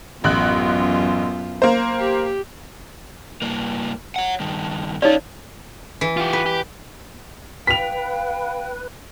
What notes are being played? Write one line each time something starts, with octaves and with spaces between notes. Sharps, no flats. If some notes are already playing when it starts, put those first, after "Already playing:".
A1 F#2 B3 F4 F#6
A#3 C5
G4
G2 A#3
C#5 F#5
G2 D#3
C#4 D#4 F4 C#5 D5
E3
F4 G4
B4
G4
B4 F5 G5 B6 F7